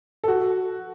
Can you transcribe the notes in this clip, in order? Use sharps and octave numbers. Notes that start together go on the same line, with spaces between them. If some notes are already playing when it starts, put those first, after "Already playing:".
A4
F#4